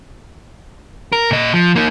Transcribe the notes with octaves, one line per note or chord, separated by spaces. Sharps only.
A#4
A#2 D#5
F3
A#3 D#4